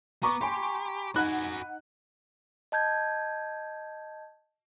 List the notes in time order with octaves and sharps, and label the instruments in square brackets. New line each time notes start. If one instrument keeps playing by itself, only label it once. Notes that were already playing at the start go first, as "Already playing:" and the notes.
[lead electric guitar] B3 [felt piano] A#5 C#6 D6
[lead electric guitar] G4 [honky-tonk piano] G#5 B5 C6
[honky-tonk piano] D#4 F#5 [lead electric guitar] F#4 G#5 [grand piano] B5 F#6
[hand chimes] D#5 A5 G6 G#6